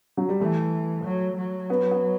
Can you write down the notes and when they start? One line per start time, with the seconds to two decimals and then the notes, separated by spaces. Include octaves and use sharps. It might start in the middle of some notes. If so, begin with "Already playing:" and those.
0.17 F#3
0.29 G3
0.40 E3 A3
1.04 F#3
1.37 F#3
1.70 B3
1.91 B3